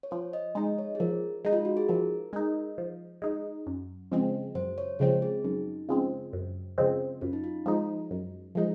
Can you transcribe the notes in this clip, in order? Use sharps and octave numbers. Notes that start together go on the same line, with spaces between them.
C#5
F3 C5
D#5
G#3 D#4 D#5
C#5
G#4
F3 A#4
G#3 D#4
F4
F#4
G#4
F3 A#4
G#3 D#4
F3
G#3 D#4
F#2
C#3 F3 G#3 C4
F#2 C5
C#5
C#3 F3 G#3 C4 C5
G#4
F#2 D#4
C#3 F3 G#3 C4
F#2
C#3 F3 G#3 C4
F#2 F4
D#4
F4
F3 G#3 D#4
F#2
F3 G#3 D#4